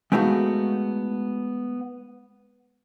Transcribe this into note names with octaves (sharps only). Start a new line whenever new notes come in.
G#3 A3 B3 D#4 F#4 F5